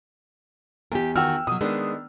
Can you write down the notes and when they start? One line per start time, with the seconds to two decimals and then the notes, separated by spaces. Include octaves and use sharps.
0.92 E2 G4 A#4
1.16 D#3 F#4 G5 E6 F6
1.47 B2 F#3 D#6
1.61 D#3 G#3 B3 D4